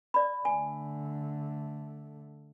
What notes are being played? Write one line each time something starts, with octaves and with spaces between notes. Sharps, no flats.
D5 B5
D3 A3 G#5